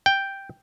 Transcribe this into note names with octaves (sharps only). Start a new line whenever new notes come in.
G5